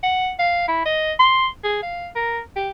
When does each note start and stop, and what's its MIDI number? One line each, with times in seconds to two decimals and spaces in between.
0.03 0.32 78
0.39 0.64 77
0.68 0.82 64
0.85 1.12 75
1.19 1.47 84
1.64 1.81 68
1.83 2.09 77
2.15 2.40 70
2.56 2.70 67